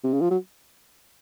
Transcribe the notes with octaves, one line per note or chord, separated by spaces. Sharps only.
C3
C#3
F3
F#3